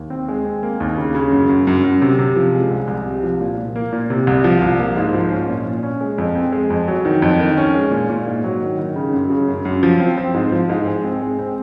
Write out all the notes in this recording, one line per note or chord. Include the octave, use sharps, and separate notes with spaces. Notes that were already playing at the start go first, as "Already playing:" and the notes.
Already playing: D#2
C4
G#3
C4
A#3
D#2
C#3
C#3
F#2
F#2
F#2
F#2
C3
C3
F3
G#3
C2
C2
C3
F3
A#2
A#2
A#3
A#2
C3
C2
F3
C2
A#3
G#2
F3
C#4
A#2
A#2
C#4
G#3
F2
C4
G#3
F2
F#3
D#3
F2
D#3
C#4
G#3
A#2
A#2
G#2
F#3
D#3
D#3
C#3
F#2
C#3
F#2
F#2
F3
C4
C4
G#2
F3
G#2
G#3
C4
G#3
C4